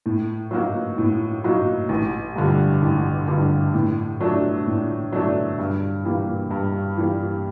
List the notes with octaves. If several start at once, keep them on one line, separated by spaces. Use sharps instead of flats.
A2
F#3 A#3 D#4 F#4
A2
F#3 A#3 D#4 F#4
A1
G2 D3 G3
A1
G2 D3 G3
A2
F#3 A3 D4
A2
F#3 A3 D4
G2
E3 G3 A#3
G2
E3 G3 A#3